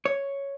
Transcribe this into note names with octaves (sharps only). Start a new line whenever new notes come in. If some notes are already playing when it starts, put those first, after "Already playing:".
C#5